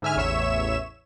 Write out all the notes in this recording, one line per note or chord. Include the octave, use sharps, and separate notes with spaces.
G#2 D3 E5 G#5 F6
A1 E2 C#5 E5 E7